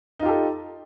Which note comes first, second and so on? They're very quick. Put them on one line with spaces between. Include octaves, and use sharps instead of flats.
D#4 F4 G4 A4